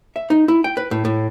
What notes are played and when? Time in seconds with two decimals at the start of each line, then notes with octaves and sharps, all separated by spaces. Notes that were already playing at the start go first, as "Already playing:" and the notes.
0.16 E5
0.30 D#4
0.48 E4
0.64 G5
0.77 B4
0.91 A2
1.05 A2